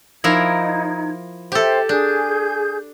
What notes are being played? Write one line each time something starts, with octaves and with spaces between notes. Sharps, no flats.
F3 D#4 E4 A#4 G#6
G4 A4 C5 E5 G5
D4 G#4 G6